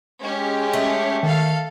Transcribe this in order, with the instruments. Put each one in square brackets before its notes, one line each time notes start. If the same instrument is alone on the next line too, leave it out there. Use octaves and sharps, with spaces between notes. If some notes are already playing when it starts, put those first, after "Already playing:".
[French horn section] G#3 [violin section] C#4 G4
[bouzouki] A3
[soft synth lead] D#3 [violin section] A4 F5